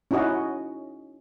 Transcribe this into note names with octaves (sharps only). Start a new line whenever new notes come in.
C#4 D#4 E4 F#4 D#5